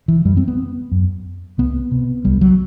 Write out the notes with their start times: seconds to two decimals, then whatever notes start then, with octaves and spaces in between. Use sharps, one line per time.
0.08 E3
0.25 F#2 G3
0.37 C4
0.48 B3
0.92 F#2
1.58 C2 B3
1.91 C3
2.25 C2 G3
2.41 F#3